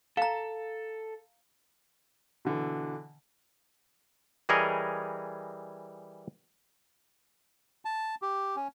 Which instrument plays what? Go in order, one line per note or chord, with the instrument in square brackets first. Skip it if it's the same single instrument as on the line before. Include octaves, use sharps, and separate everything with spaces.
[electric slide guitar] A4 [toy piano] F5 A#5
[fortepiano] B2 D3 E3
[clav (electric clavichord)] E3 G3 G#4 A#4 C#5 D#5
[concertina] A5
G4
C#4